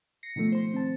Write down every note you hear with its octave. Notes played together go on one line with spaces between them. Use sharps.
A#6 C7 C#7
B2 D#3 F3 A3
C5 C6
C4 A5